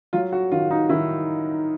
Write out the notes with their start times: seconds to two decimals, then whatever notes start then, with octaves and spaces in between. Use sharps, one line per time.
0.13 F#3 F4
0.32 F#4
0.52 D#3 F4
0.71 D#4
0.89 D#3 E4